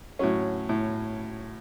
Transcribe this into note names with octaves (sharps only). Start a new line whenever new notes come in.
A2 F#3 C#4
A2